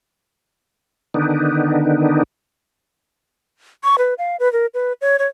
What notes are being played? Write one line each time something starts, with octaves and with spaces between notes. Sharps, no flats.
D3 D#3 B3 D4 D#4
C#6
B4
F5
B4
A#4
B4
C#5
C#5